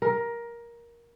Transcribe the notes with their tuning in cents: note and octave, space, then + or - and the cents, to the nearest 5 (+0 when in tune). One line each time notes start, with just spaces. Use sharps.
A#4 +15